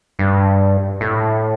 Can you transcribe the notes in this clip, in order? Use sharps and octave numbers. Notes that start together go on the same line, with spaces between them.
G2
A2